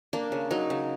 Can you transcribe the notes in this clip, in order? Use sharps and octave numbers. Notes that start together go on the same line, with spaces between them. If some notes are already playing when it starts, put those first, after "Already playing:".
A#3 D4
C#3
F#3 D#4
C#3